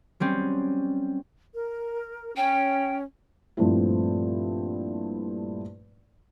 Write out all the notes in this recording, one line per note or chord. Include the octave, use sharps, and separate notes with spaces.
F#3 G3 C4 C#4
A#4
C#4 G5
G2 A#2 F3 A3 C4 E4